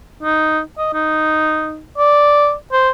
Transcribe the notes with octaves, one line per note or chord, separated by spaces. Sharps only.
D#4
D#5
D#4
D5
C5